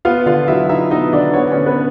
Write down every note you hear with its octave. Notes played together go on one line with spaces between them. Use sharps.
B3 F4 F5
D3 F4 F5
F#3 E4 E5
D#4 E4 E5
B3 D#4 D#5
D3 D4 D5
B3 C#5
D5
D3 C#4 C#5
B3 B4